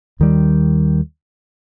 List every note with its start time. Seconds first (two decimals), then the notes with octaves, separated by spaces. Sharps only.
0.20 D#2 D#3 G3